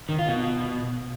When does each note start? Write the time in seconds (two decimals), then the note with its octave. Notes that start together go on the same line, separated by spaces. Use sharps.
0.09 D#3
0.19 F4
0.29 B2